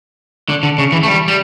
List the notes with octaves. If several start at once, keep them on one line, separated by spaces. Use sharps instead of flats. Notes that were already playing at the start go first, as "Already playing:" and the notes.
D3
D3
C#3
E3
A3
G3
G3